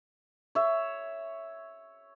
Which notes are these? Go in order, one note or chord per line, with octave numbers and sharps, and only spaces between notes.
C#5 E5